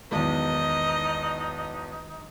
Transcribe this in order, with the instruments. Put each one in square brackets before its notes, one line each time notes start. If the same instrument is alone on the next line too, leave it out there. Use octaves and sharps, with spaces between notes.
[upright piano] B1 E2 [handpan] D#3 G#3 [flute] D#4 [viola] D#5